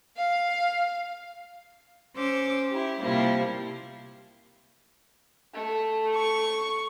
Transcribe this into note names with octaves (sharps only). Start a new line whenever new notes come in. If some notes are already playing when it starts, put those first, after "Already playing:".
F5
C#4 C5 D6 E6
E4 G4
C3 F3 G3 A#3 E4
A3
C#6